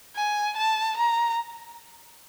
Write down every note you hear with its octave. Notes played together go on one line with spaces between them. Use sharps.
G#5
A5
A#5